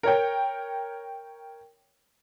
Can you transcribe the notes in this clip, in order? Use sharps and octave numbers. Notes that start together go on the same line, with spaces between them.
A#4 C#5 G5